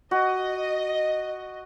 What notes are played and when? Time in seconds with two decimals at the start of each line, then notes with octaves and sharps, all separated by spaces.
0.11 F#4 D#5